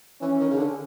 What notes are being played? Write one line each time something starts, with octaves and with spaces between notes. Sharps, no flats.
E3 C#4
D#3
C#3
D3